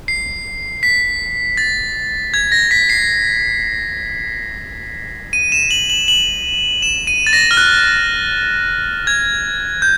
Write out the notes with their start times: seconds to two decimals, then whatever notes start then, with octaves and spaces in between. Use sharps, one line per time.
0.08 C7
0.83 B6
1.57 A6
2.34 G#6
2.52 A#6
2.71 B6
2.89 C7
5.33 D#7
5.52 E7
5.71 F#7
5.90 F#7
6.08 F#7
6.82 E7
7.07 D#7
7.27 A6
7.33 A#6
7.51 F6
7.57 F#6
9.07 G#6
9.82 G6